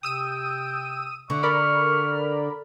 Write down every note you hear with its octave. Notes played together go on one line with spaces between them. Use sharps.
C3 G5 D#6 E6 D#7
D3 D5 E5 F#5 C#6
A#4 D5 B5 F6